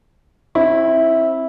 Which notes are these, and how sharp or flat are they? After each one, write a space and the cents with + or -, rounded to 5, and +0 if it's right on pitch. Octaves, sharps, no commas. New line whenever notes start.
C4 +25 E4 -10